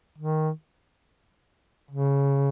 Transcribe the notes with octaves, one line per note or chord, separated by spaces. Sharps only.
D#3
C#3